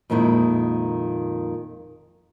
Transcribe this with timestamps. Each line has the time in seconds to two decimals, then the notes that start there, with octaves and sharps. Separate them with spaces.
0.10 F2 A#2 D#3 G#3 E4